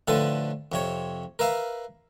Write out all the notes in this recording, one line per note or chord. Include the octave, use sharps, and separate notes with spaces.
A2 D3 F3 A4 B4
F2 C3 C#5
A#4 B4 E5 F5